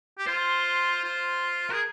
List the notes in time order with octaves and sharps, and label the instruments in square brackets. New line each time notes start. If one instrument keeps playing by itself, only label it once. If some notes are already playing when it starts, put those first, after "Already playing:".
[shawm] G4
[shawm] F4 [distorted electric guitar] C5
[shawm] F4
[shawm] G#4 [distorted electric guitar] A#4